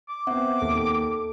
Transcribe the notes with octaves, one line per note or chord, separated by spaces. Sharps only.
D6
B3 C4 E5 F#5
D#2 A4